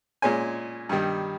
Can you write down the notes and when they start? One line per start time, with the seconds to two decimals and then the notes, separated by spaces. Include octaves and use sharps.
0.22 A#2 G#3 C#4 G#5
0.89 G2 D#3 G3